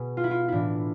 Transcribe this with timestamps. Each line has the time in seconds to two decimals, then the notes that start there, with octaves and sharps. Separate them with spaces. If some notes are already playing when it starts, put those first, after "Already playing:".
Already playing: B2 G#4
0.17 F4
0.24 E4
0.31 F4
0.48 A2 E3 D4 E4